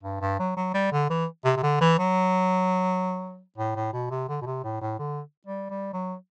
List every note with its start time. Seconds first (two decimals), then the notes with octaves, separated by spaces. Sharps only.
0.03 G2
0.21 G2
0.39 F#3
0.57 F#3
0.74 G3
0.92 D3
1.10 E3
1.45 C3
1.57 C3
1.63 D3
1.81 E3
1.98 F#3
3.58 A2
3.75 A2
3.93 B2
4.11 C3
4.29 D3
4.42 B2
4.46 C3
4.64 A2
4.81 A2
4.99 D3
5.47 G3
5.70 G3
5.93 F#3